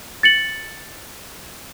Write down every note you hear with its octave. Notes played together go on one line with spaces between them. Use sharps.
A6 C#7 F#7